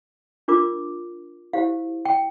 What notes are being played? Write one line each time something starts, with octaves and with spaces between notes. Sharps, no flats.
D4 F4 A#4 D6
E4 G4 C5 F5
G5